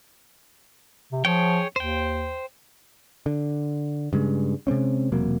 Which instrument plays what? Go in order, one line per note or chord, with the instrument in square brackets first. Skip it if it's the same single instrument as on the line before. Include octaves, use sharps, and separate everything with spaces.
[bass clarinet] C3
[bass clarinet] F3 [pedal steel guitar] G#4 C#5 G5
[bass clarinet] D#2 [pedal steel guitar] C5 G5
[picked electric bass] D3
G2 C#3 G#3
C3 G#3 C4 C#4
E1 C3 F#3 A#3